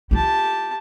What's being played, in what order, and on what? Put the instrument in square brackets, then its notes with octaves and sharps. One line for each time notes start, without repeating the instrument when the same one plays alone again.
[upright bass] E4 F4 [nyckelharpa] G4 A5